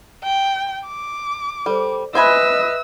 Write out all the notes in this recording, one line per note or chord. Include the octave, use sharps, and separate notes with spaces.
G5
D6
G3 A4 C5
B4 C5 D#5 E5 G#5 B5 E6 F#6